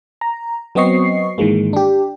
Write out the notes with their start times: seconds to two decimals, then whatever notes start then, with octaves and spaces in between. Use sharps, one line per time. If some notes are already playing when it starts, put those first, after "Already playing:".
0.21 A#5
0.75 F#3 B3 C4 D#5 C#6 C7
1.38 G#2 D#3 E3 G#3 A#3
1.73 D4 G4